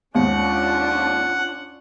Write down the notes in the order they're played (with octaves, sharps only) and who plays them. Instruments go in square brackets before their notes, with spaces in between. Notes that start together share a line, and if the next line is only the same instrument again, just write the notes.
[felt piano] D#2 G#2 [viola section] C#4 D4 F4 [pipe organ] F#5